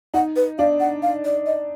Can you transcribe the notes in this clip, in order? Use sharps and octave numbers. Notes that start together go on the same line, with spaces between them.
D#4 F#5
B4
D4 F5
F#5
F5
D5
D#5